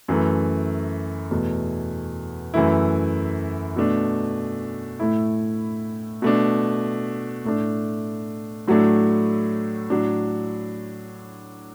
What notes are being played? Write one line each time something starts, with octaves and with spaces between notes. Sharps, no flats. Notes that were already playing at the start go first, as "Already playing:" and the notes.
F#2 E3 A3
E2 B2 A3
F#2 E3 A3 E4
B2 A3 D4
A2 A3 E4
B2 A3 D4
A2 A3 D4
A2 F#3 A3 D4
A2 F#3 D4